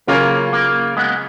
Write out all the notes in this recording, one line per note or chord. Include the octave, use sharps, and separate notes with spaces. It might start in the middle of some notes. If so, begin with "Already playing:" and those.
C#3 F#3 A#3 C#4 F4 A#4
A#3
G#3 B3